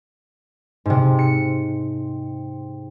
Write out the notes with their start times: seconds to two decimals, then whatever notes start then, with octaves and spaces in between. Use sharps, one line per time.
0.86 G#2 C3
1.19 C#7